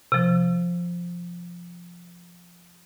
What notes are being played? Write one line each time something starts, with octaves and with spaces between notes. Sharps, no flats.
C3 F3